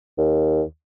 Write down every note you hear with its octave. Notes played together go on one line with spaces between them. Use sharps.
D#2